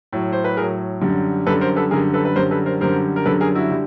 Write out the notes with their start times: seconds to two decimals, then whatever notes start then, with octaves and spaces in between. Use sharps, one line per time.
0.13 A2 F#3
0.32 C5
0.44 B4
0.57 A2 F#3 G#4 A#4
1.01 F#2 D3 G3
1.46 F#2 D3 G3 A4 B4
1.61 A#4 C5
1.76 A4 B4
1.91 F#2 D3 G3 G#4 A#4
2.14 A4 B4
2.25 B4
2.36 F#2 D3 G3 A#4 C5
2.51 A4 B4
2.66 A#4 C5
2.81 F#2 D3 G3 A#4 C5
3.16 A#4
3.26 F#2 D3 G3 A4 B4
3.41 G#4 A#4
3.55 E4 F#4
3.71 D3 G3